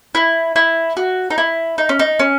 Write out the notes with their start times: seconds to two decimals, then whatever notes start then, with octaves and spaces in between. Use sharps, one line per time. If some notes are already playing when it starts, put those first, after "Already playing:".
0.15 E4
0.56 E4
0.97 F#4
1.30 D#4
1.38 E4
1.78 D#4
1.89 C#4
1.99 D#4
2.19 C#4